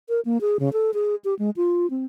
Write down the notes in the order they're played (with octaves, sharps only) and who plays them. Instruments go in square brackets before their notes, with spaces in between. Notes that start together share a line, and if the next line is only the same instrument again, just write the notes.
[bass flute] A#4
A#3
G#4
C#3
A4
G#4
G4
G#3
F4
C4